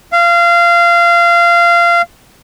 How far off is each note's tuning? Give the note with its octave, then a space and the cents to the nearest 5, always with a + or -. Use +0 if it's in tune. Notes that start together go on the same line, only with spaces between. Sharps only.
F5 -20